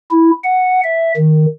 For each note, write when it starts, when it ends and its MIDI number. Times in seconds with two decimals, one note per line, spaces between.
0.11 0.31 64
0.44 0.81 78
0.83 1.12 76
1.16 1.46 51